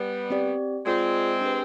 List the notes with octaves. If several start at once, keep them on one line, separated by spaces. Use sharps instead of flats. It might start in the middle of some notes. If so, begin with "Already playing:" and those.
Already playing: G3 B3
C4 G4 D5
G#3 C4 F4 G#4 D5
D4 G4 B4